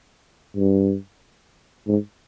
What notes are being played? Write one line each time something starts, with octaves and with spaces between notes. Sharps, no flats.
G2
G#2